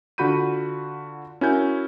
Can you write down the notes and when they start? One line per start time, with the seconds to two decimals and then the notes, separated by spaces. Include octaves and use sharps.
0.18 D3 F4 F#4 B5 G6 D#7
1.41 C#4 E4 F#4 A#4 G#5 G6